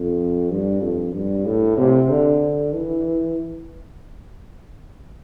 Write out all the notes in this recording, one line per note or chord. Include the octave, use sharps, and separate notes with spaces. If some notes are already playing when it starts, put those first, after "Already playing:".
Already playing: F2
G2
F2
G2
A2
C3
D3
E3